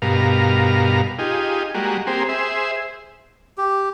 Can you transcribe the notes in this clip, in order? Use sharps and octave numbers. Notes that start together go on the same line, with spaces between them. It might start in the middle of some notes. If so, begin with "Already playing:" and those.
G2 B2 A#4 F5
D#4 F4 G4 G#4
G3 G#3 A#3 F#4
A#3 C4 G4 G#4 C5
G#4 C5 E5
G4